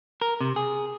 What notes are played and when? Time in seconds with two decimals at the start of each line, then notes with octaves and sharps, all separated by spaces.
0.22 A#4
0.41 C3
0.56 G#4